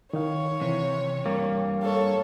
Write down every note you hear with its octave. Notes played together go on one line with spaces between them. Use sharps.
D#3 D#4 C#5 F5
C3 E3
G2 A#3
A4 C#5 F5